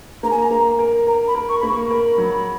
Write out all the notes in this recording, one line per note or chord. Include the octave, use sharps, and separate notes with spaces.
A#3 A#5
G#5
A#5
A#3
A#4
A#4 A#5
B5
A#4
C#6
A#3 B5
C#6
A#4 B5
F#3